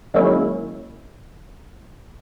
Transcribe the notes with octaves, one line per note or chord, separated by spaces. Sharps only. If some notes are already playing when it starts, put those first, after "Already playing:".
D#3 F#3 G#3 A#3 C#4 E4